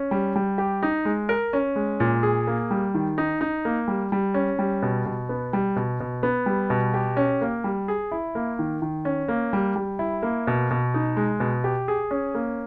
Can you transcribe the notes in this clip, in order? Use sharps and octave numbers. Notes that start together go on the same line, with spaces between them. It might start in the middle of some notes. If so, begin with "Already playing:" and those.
Already playing: C#4
G3
G3
G4
D#4
G#3
A#4
C#4
G#3
A#2
G#4
A#3
G3
D#3
D#4
D#4
A#3
G3
G3
C#4
G3
B2
B2
B3
G3
B2
B2
B3
G3
B2
G4
C#4
A#3
G3
G#4
E4
A#3
D#3
D#3
C#4
A#3
G3
G3
E4
A#3
B2
B2
D#4
G#3
B2
G4
G#4
C#4
A#3